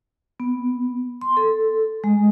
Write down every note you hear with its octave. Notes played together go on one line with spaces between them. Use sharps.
B3
C6
A4
G#3